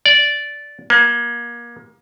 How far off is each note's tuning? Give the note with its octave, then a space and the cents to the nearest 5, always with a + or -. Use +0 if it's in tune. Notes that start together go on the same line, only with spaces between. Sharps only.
D5 -10
A#3 +30